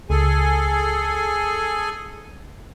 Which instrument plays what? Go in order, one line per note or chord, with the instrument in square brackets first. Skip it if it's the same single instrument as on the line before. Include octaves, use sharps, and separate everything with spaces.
[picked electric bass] C#2 [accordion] G#4 A4 G#5